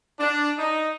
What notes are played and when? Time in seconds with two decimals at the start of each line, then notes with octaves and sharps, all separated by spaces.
0.19 D4
0.59 D#4